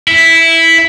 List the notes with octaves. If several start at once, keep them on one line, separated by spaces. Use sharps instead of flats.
E4